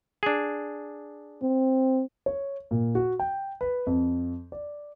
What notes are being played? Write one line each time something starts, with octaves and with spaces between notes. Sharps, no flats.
D4 G#4
C4
C#5
A#2
F#4
G5
B4
F2
D5